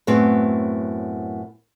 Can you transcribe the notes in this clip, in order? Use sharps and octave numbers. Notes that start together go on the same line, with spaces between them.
F#2 A2 B3 C4